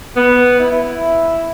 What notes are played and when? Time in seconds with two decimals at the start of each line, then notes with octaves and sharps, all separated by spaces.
0.16 B3
0.59 E4